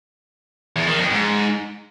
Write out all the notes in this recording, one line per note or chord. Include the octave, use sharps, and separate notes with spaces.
E2
D#3
F2
G#2